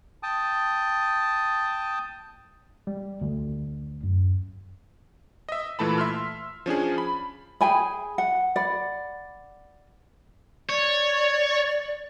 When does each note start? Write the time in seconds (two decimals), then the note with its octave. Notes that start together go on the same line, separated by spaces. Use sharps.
0.23 G5 A5 D#6
2.87 G3
3.21 D2
4.03 F#2
5.49 D#5 E5
5.79 A#2 E3 A3 A5 B5
5.98 E5 C6 F6
6.66 F3 C#4 D4 G#4
6.98 B5
7.61 G#4 G5 G#5 B5
8.18 F#5
8.56 D5 F#5 B5
10.69 C#5 D5